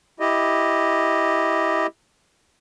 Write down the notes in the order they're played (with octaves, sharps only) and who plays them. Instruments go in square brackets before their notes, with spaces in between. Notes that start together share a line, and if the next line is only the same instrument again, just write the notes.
[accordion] E4 G4 D#5